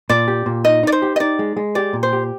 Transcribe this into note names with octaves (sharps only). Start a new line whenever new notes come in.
A#2 D5
G4
A#2
D#4 D#5
D#4 D5
C5
G4
D#5
D#4 D5
G#3
G#3
G4 D5
A#2
C5
G4